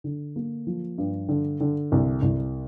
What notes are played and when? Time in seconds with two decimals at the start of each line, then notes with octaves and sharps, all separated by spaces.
0.04 D3
0.36 A#3
0.67 F3
0.98 G2
1.29 D3
1.60 D3
1.92 C2
2.22 C2